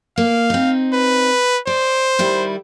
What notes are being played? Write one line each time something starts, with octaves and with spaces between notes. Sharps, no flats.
A#3 F5
C4 D#4
B4
C5 D5
D#3 G3 E4